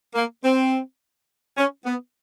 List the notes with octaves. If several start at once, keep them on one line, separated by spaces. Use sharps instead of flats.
A#3
C4
C#4
B3